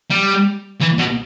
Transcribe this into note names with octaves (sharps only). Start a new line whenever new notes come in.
G3
E3
B2